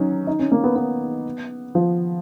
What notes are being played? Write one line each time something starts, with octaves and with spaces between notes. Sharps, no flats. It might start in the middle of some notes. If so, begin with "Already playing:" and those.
Already playing: F#3 C#4 D#4
D#4
C#4
A#3
B3
B3
F3